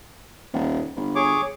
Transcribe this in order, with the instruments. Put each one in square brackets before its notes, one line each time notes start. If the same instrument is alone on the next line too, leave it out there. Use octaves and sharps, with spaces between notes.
[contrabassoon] D#1
G1
[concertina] G#4 C#5 D6